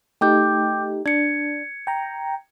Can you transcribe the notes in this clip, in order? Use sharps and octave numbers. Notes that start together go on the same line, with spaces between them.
A3 D#4 G4 G5 D6 G6
D4 G#6 C#7
G5 A#5